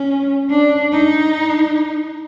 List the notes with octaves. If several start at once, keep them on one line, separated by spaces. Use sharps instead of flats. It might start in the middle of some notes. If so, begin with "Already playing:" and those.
Already playing: C#4
D4
D#4